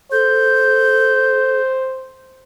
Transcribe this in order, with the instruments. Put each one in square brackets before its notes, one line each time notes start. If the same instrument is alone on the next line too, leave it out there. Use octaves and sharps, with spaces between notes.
[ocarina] A4 [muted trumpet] C5 [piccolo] G6